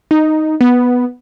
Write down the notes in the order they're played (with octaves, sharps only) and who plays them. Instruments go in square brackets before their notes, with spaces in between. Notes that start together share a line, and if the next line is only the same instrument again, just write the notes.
[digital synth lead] D#4
B3